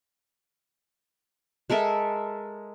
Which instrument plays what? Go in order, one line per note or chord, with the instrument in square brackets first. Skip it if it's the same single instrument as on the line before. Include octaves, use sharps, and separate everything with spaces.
[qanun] G#3 A4 A#4 E5